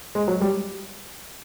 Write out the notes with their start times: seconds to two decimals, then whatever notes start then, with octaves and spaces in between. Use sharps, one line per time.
0.15 G#3
0.28 F#3
0.41 G3